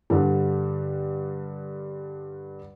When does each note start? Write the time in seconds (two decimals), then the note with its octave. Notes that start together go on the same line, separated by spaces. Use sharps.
0.10 G2 D3 G3